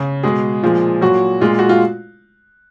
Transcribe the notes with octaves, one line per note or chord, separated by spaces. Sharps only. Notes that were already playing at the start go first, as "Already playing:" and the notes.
Already playing: C#3
B2 G#3 G#4
A#2 F3 G#3
A#2 F#3 F#4
A#2 G#3 F4
F#4
F4